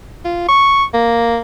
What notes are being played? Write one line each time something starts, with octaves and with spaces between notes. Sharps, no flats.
F4
C#6
A#3